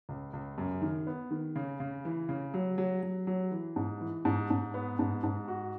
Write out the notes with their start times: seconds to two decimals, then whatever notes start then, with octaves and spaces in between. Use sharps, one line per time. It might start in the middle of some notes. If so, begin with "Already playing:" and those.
0.09 C#2
0.33 C#2
0.58 F#2
0.82 D#3
1.07 B3
1.31 D#3
1.56 C#3
1.80 C#3
2.05 E3
2.29 C#3
2.54 F#3
2.78 F#3
3.03 F#3
3.27 F#3
3.51 E3
3.76 G#2
4.01 E3
4.25 G#2
4.50 G#2
4.74 B3
4.99 G#2
5.24 G#2
5.48 F#4